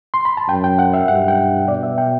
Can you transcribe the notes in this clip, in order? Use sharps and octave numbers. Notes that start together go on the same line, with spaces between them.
C6
B5
A5
F#2 G5
G5
F#5
E5
G2 F#5
G5
B2 D5
E5
G5